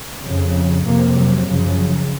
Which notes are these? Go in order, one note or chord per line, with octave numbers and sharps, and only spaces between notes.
F2 C#3
F2 C3 A#3
F#3
F#2 C#3 F3